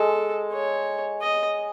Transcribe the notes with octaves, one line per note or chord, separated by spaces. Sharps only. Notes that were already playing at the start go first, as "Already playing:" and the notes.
Already playing: G#3 A4
C#5
D#5